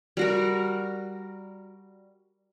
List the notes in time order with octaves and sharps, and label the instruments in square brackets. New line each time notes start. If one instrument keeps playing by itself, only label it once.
[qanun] G3 F#4 A#4